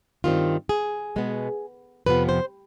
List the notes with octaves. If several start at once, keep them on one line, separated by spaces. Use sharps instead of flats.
G2 D#3 G3 C4 F4
G#4
B2 G#3 B3
F2 C3 F3 B3 B4
C5